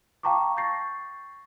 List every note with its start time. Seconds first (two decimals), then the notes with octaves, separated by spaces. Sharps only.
0.23 F5 G5 A5 A#5 C#6 D6
0.57 C#6 G6 A6 A#6 C7